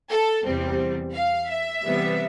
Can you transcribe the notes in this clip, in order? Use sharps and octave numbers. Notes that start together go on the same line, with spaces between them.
A4
E2 C3 G3 C4
F5
E5
C3 E3 G3 B3